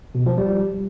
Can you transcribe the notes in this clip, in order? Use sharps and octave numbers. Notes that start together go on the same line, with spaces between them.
B2
F3
G3